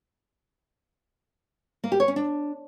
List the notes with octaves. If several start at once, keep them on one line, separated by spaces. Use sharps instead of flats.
A#3
G4
C#5
C#4
D4